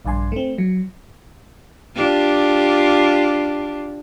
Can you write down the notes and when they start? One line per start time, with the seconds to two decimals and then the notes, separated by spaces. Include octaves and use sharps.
0.05 A#1 G2 D3 G#5 C6
0.32 A3 C4
0.58 F#3
1.95 D4 F4 G4